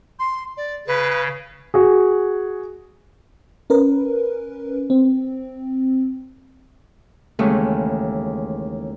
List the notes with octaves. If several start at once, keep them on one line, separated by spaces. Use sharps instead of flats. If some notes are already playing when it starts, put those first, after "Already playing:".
C6
D5
C#3 B4
F#4 G#4
C#4 A#4 B4
C4
D#2 C#3 E3 G#3 A3